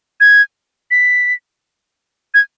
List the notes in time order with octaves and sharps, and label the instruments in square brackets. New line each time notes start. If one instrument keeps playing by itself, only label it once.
[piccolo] G#6
B6
G#6